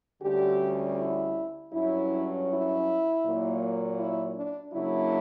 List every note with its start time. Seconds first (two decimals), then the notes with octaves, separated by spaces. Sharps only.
0.22 D2 D3 G3 C#4 G4
0.97 E4
1.72 G2 F#3 C#4 E4
2.48 E4
3.24 A#2 F#3 A#3
3.99 E4
4.36 D4
4.74 C#3 F#3 A#3 D4 E4